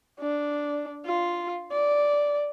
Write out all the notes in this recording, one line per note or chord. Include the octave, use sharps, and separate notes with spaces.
D4
F4
D5